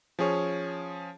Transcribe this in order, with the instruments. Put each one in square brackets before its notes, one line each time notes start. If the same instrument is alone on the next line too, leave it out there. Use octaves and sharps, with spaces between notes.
[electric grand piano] F3 C#4 G#4 C#5